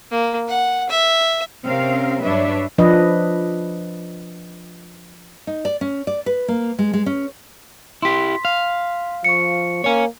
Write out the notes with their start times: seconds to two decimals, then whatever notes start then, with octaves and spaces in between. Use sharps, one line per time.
0.11 A#3
0.48 F#5
0.89 E5
1.66 C3 C4 C#4 A#4 C5 F5
2.22 G2 F#3 D4 B4 C#5 E5
2.78 F3 D4 B4 D#5
5.47 D#4
5.65 D5
5.81 C#4
6.07 D5
6.26 B4
6.48 A#3
6.79 G#3
6.93 G#3
7.06 C#4
8.02 E4 G4 C6 B6
8.45 F5
9.24 F3 C#6 C#7
9.84 A#3 C#5 G#5